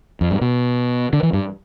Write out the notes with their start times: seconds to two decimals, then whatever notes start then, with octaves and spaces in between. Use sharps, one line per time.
0.21 F2
0.31 G2
0.41 B2
1.13 D3
1.23 E3
1.33 G2